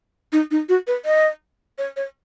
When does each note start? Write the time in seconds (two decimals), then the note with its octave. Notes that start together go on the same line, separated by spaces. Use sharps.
0.32 D#4
0.51 D#4
0.69 F#4
0.87 B4
1.05 D#5
1.78 C#5
1.96 C#5